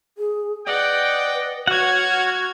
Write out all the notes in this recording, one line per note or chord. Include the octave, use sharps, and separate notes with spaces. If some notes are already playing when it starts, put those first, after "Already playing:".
G#4
B4 D5 D#5 F#5 G5
F#4 C#5 F#5 F6 G#6